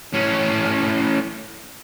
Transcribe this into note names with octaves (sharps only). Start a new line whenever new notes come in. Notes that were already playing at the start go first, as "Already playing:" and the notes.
A2 C#4